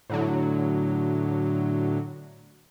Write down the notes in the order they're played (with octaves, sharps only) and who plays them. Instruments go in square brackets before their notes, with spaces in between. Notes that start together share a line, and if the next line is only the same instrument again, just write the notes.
[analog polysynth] A2 D3 F#3